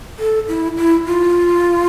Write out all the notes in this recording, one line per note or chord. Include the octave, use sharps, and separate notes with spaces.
A4
E4
E4
F4